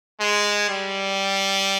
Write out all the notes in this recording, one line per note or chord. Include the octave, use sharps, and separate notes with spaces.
G#3
G3